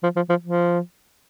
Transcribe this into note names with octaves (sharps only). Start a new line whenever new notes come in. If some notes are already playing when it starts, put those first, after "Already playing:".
F3
F3
F3
F3